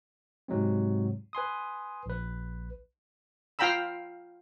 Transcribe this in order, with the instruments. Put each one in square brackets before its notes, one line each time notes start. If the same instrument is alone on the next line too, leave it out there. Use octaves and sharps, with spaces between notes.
[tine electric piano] G#2 C3 F#3 G#3 C4
B4 G#5 C6 D#6
A#1 B4
[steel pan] F4 F5 G5 A#5 B5 E6